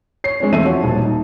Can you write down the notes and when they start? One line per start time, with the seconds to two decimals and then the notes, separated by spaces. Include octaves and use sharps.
0.24 C#5 C7
0.40 G#3 C4 D4 C#5
0.53 E2 A3 C4 A4 E5 D#7
0.64 F3 F#4 C#5
0.84 D#1 A5
1.05 D#4